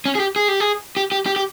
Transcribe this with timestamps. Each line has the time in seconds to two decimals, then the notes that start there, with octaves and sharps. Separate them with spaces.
0.05 C#4
0.15 G#4
0.20 G4
0.36 G#4
0.48 G4
0.60 G#4
0.97 G4
1.12 G4
1.26 G4
1.36 G4